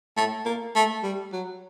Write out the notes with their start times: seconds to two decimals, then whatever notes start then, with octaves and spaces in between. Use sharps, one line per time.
0.17 A3
0.46 A#3
0.76 A3
1.03 G3
1.33 F#3